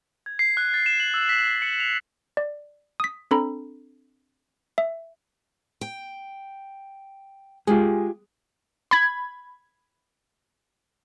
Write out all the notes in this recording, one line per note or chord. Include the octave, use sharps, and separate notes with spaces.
G#6
C7
F#6
A6
E7
F#7
E6
B6
C7
C#7
F7
D5
D#6 B6
C4 D4 A4 A#5 B5
E5
G5
G#3 F4 G4 G#4
B5 G#6